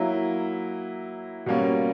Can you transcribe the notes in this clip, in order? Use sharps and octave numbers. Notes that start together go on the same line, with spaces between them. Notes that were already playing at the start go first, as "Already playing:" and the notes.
Already playing: F#3 A#3 E4
B2 G3 A#3 C#4